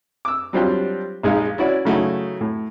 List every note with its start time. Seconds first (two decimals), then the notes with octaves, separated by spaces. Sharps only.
0.25 D6 E6
0.53 F#3 G3 C4 D4 F4 G4
1.23 A#1 G#3 D#4 F5
1.58 C#4 E4 F#4 D5
1.85 C#3 F#3 A3 D#4 E4 F#4
2.41 A2